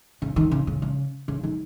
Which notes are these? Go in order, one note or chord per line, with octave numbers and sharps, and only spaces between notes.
C#3
D#3
C#3
C#3
C#3
C#3
D#3